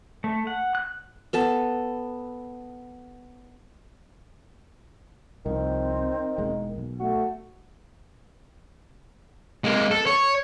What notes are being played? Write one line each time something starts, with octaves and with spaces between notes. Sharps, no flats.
A3
F#5
F#6
B3 A4 A5
C2 D#3 F3 C4
E1 G#3 A#3
B1
A3 F#4
G#3 A#3
A4
C#5